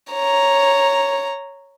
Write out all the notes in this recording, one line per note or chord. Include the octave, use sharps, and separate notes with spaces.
C#5 A#5